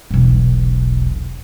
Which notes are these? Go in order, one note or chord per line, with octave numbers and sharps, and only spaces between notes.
E1 B1